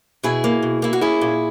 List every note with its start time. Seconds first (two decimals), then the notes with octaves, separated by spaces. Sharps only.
0.23 B2 E4 G#4
0.44 A#3
0.63 B2
0.82 A#3 E4
0.93 F#4
1.01 C#4 E4 G#4
1.21 A#2